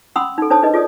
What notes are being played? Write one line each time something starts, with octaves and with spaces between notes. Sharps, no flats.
C#4 F#5 B5 C6 D#6 E6
D#4 A4
D4 D#4 C5 C#5 A5 D#6
D4 D#4 G#4 B4 D#5
F4 G#4 A4 C#5 D5 D#6